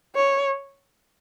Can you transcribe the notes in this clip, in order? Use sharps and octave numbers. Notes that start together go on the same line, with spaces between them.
C#5